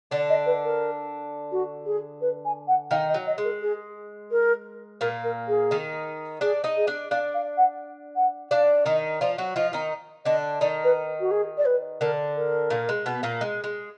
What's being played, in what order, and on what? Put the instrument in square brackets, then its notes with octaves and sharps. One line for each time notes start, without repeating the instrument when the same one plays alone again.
[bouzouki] D3 D4 [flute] D5
[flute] D#5
B4
A#4
F#4
G#4
B4
G#5
F#5
[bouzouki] D#3 D#4 [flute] F5
[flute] D#5
[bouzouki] F#3
[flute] D#5
[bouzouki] G#3
[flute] A#4
G#4
A#4
[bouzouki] A#2 A#3 [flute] A#4
[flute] A#4
G#4
[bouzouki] D#3 D#4
[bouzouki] D4 D5 [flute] G#4
[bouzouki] D#4 D#5
[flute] G#4
[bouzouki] D4 D5
[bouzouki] D4 D5 [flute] F5
[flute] F5
F#5
F#5
[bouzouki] D4 D5 [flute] F5
[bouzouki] D#3 D#4 [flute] D#5
[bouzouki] F3 F4 [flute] D5
[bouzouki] F#3 F#4
[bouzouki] F3 F4 [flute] D#5
[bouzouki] D#3 D#4
[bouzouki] D3 D4 [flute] D#5
[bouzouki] D#3 D#4 [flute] D5
[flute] B4
F#4
G#4
D5
B4
[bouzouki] D3 D4 [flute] A#4
[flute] A#4
[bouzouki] A#2 A#3
G#3
B2 B3
A#2 A#3
G#3
G#3